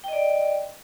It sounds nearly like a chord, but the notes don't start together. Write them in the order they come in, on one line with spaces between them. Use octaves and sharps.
G5 D#5 D5